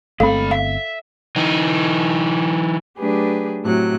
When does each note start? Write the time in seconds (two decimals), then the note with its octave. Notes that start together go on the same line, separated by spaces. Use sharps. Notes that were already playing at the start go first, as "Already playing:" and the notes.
0.20 G1 G#3 A3 C4 A4 F5 B5
0.51 E5 F5
1.36 E3 D#4
2.98 F#3 A3 D4 G4 G#4 B4
3.64 A2 C3 F#3 F#6